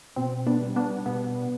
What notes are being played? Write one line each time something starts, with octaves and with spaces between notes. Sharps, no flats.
B2 C4
B3 D4
G3
B3 D4
B2 B3